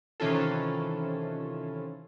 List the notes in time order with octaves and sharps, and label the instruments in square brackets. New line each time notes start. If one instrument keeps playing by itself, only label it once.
[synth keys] C3 D#3 E3 C#4 F4 A4